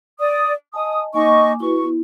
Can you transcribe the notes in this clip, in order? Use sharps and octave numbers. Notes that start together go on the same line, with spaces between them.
D5 D#6
D#5 G#5 A5 D#6
A#3 D#4 D#5 G#5 C#6 D6
E4 F#4 B4 C#6
B3 E4